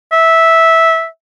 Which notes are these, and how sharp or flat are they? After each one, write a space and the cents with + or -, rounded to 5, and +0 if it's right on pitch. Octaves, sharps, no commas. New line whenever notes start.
E5 -10